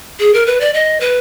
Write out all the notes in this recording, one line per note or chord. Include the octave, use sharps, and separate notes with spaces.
G#4
A#4
B4
D5
D#5
B4